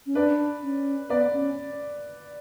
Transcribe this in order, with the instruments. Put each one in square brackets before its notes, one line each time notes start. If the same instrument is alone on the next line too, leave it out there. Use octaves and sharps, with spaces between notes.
[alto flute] C#4
[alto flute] D4 [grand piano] B4 D5
[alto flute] C#4
[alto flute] B3 [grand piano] B4 D5
[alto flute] C#4